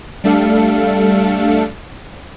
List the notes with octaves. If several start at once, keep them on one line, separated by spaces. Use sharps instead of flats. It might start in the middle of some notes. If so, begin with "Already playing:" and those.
G3 A3 D4 A4 F5 C#7